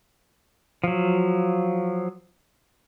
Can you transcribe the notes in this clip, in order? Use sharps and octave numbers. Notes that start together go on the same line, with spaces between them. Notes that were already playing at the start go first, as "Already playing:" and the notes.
F3 F#3